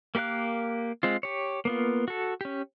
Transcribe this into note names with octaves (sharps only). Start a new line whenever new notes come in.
A#3 G4 A#4 F5 F#6
G#3 C4 F4
G4 C#5
A#3 B3 F4
F#4 A4
C#4 G4